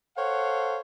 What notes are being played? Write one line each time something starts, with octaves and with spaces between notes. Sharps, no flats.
A4 C5 C#5 F5 F#5